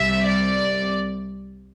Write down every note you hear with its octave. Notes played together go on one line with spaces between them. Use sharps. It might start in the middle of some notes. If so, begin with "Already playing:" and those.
Already playing: C2 C3 G3 E5
D5